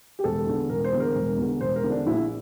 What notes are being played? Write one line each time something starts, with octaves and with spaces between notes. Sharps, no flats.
G4
E1 A4
E2 D3
E1 A#4
C5
E2 D3
A#4
E1
E2 D3
E1 C5
A#4
E2 D3
D4
A#1 E4